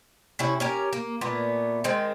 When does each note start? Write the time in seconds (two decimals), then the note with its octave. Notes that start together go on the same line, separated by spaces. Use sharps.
0.39 C3 C#4 E4
0.60 C#4 G4 A#4
0.93 A#3
1.21 A#2 A3 B3
1.84 D#3 G#3 C4